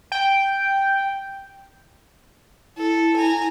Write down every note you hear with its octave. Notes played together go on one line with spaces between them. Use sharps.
G5
E4 A4
G#5 A#5